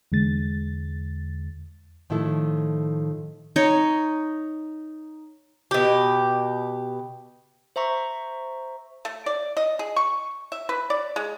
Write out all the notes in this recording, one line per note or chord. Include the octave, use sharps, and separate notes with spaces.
E2 D3 G#3 A6
A2 D#3 F3 E4 A4
D#4 C#5
B2 G4
C5 E5 A#5 C#6
A3
D5
D#5
G#4
C#6
E5
B4
D5
G#3